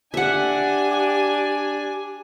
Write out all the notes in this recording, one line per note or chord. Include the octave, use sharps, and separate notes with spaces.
D4 G4 E5 F#5 G#5